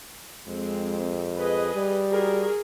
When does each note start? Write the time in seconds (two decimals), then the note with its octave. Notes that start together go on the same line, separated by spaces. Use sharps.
0.48 F2 G#3 C4
1.36 G#4 B4 D#5
1.74 G3
2.09 F#4 G#4 A#4